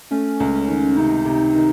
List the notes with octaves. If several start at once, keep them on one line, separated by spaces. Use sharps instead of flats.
A3 C#4
C#2
C#4
D#3
C3 D#4
C3
D#3